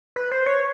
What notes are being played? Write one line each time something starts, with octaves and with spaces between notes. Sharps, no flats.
B4
C5
C#5